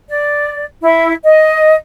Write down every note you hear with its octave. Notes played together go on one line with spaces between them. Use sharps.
D5
E4
D#5